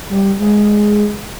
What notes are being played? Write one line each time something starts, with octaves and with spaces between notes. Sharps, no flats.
G3
G#3